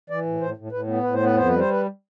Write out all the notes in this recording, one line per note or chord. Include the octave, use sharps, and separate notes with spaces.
E3 D5
A2
A2 C5
A2
A2 B4
B3
A2 B4
C5
B3
B4
F2 C5
G3 B4
C5
B4